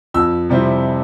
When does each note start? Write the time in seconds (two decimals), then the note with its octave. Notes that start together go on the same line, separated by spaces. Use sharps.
0.14 F2 E6
0.49 C3 G3 C4 E4